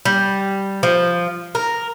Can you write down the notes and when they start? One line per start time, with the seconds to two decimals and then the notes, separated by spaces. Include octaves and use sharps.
0.05 G3
0.83 F3
1.55 A#4